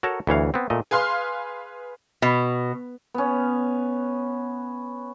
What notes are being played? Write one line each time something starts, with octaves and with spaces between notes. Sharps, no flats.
F#4 A4 A#4 C#5 A5 A#5
D2 E3 C#5 F5
B3 C4
A#2 A3 D#5
G#4 B4 F5 C6 F6
B2
B3 C#4